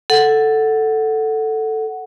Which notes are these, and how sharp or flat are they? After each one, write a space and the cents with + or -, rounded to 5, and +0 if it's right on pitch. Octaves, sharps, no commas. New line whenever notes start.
A4 +0 F#5 +0